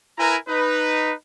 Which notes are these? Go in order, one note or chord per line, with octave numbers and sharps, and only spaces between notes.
E4 A#4 B4 G#5 A#5
D#4 B4